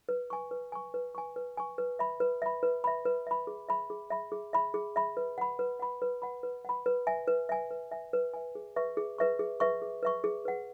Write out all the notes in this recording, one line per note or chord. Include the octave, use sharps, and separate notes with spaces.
B4
G#5 C#6
B4
G#5 C#6
B4
G#5 C#6
B4
G#5 C#6
B4
E5 B5
B4
E5 B5
B4
E5 B5
B4
E5 B5
G#4
E5 B5
G#4
E5 B5
G#4
E5 B5
G#4
E5 B5
B4
F#5 B5
B4
F#5 B5
B4
F#5 B5
B4
F#5 B5
B4
E5 G#5
B4
E5 G#5
B4
E5 G#5
B4
E5 G#5
G#4
B4 E5 C#6
G#4
B4 E5 C#6
G#4
B4 E5 C#6
G#4
B4 E5 C#6
G#4
B4 F#5